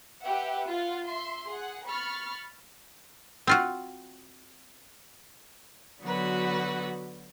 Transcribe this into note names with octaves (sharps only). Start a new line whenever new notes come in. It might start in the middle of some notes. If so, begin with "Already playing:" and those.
G4 B4 E5 F#5
F4 F5 F#5
E5 C6
G#4 F#5
B5 C#6 F6 A6
C4 F4 F#4
D3 F#3 B3 F#4 B4